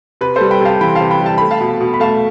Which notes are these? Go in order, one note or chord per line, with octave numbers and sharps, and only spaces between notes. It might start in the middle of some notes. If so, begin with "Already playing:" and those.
C3 B4
G3 A4 C5
G5 B5
C3 F5 A5
E3 G5 B5
F5 A5
C3
G5 B5
G3
A5
A3 B5
F5 A5
B2
B2
B5
A3 F5 A5